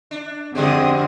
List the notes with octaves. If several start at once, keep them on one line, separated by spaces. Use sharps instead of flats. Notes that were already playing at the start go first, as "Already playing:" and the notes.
D4
E2 D3 G#3 C4 G4 D#6